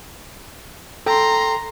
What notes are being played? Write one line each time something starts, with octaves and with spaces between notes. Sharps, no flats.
A4 G5 A#5 C6